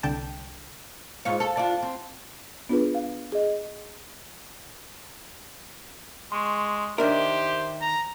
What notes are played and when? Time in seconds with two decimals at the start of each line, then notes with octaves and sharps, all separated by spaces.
0.03 C2 D3 G5 A5
1.25 G#2 F4 C#5
1.40 A4
1.57 D4 F4
1.82 C4
2.69 B3 D4 F4 G#4 B4
2.95 F5
3.32 G#4 D#5
6.32 G#3 C6 C#6
6.98 D#3 D4 G4 A#4 C5 E5
7.81 A#5